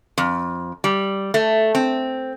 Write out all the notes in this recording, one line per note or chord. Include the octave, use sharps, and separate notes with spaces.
F2
G3
A3
C4